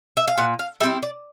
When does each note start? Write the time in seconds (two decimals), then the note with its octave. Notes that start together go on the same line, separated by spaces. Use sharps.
0.17 E5
0.28 F5
0.38 A#2 F#5
0.59 F5
0.80 G3 C4 E4 E5
1.02 D5